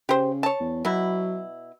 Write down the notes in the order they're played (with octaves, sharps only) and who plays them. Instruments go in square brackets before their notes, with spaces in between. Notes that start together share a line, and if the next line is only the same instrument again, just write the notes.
[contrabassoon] C#3 [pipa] G4 C5
[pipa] C#5 A5
[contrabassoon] E2
[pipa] B2 E4 [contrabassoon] F#3